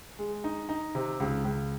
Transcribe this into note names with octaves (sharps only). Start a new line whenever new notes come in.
G#3
D#4
D#4
C3
C#2
C#2